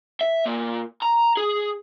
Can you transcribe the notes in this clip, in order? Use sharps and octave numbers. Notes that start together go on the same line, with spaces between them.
E5
A#2
A#5
G#4